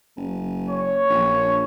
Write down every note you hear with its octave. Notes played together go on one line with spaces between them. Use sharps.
F#1
C#5
A#1